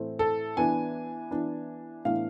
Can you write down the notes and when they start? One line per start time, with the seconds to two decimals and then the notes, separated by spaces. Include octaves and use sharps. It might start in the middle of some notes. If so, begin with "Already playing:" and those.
Already playing: A2 E3 A3 C4
0.19 A4
0.57 E3 B3 D4 G#5
1.31 E3 B3 D4
2.05 A2 E3 B3 D4 F5